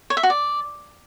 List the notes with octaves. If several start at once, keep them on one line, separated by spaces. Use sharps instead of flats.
C#5
E5
F#4
D5